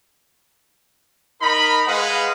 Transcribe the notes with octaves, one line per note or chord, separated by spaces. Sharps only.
D#4 A#4 D#5 B5
G#3 B4 F5 F#5 D#6